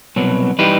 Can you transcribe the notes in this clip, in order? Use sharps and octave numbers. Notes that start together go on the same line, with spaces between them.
C2 B2 F#3
E3 G3 D#4 G4 B4